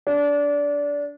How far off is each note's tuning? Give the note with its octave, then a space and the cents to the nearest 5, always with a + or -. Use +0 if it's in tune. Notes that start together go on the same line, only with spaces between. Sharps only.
D4 -20